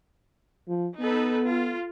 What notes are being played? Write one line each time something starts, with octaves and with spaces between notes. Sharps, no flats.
F3
B3 D#4 A4 B4
F4